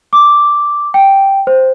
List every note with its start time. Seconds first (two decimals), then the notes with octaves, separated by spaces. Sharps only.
0.13 D6
0.94 G5
1.47 C5